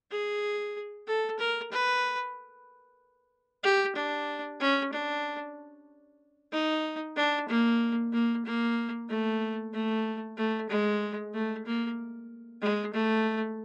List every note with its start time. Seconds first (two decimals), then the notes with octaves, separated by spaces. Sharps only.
0.11 G#4
1.07 A4
1.39 A#4
1.72 B4
3.63 G4
3.96 D4
4.60 C#4
4.93 D4
6.53 D#4
7.16 D4
7.48 A#3
8.13 A#3
8.45 A#3
9.09 A3
9.73 A3
10.37 A3
10.69 G#3
11.34 A3
11.66 A#3
12.62 G#3
12.94 A3